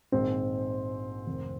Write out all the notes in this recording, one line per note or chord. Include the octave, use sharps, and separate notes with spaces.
A#1 G#2 D#3 G#3 C4 D#4
F1 F2 D#3